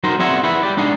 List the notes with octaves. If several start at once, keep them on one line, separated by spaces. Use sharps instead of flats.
F#3 D#4 A#4 C5
C4 G#4 D5 E5 F#5 G#5
E4 G#4 B4 E5 F#5
G4 D5
G#3 D4 D#4 G#4